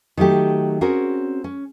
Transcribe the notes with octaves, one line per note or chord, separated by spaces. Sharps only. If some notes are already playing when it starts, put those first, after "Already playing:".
D#3 F#3 A3 G4
C4 C#4 F#4 G#4 A#4
C#4